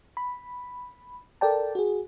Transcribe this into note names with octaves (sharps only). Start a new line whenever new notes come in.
B5
A4 A#4 D5 G5 A5
F#4 G#4